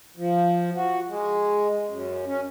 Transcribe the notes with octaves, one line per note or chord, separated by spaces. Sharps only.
F3
F#4
G#3
F#2
C#4